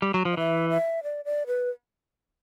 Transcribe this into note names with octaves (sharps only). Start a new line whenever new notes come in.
G3
F#3
F3
D#5
E3 E5
E5
D5
D5
B4